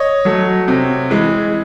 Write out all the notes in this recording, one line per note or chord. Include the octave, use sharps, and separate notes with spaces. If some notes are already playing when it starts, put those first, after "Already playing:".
Already playing: C#5 D#5
F#3 A3
C3
E3 G#3